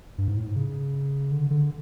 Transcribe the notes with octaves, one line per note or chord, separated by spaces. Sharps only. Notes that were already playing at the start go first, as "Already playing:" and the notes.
G2
G#2
A2
G#2
C#3
D3
D3